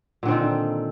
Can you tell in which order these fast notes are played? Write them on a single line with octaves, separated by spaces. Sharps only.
A#2 D3 C4 D#3